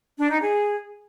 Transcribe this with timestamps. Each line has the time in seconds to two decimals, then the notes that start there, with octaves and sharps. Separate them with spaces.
0.18 D4
0.30 D#4
0.41 G#4